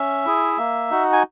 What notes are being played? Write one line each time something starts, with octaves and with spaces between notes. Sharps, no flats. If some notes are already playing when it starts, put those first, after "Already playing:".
Already playing: C#4 E5
E4 G#4
A#3
D#4 F#4
G#5